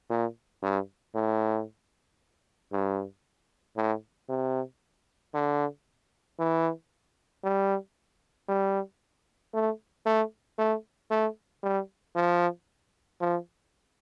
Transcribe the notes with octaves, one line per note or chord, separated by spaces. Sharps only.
A#2
G2
A2
G2
A2
C3
D3
E3
G3
G3
A3
A3
A3
A3
G3
F3
F3